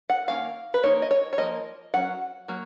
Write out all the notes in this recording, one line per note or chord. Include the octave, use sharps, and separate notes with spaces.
F#5
D#3 A#3 C#4 F5
B4
F3 A#3 D#4 C#5
D#5
C#5
C#5
F3 A#3 D#5
F#3 C#4 F#5
F#3 A#3